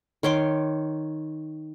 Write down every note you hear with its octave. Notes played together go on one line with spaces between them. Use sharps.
D#3 C#5 C6 D6